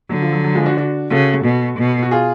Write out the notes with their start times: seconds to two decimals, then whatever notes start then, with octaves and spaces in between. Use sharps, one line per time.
0.09 D3 F#3
0.22 F3
0.32 F#3
0.44 F#3
0.55 F3 G#3
0.66 D4 F#4
0.77 D4 F#4
1.10 C#3 F#4 A4
1.45 B2
1.78 B2
2.03 F#4
2.11 F4 G#4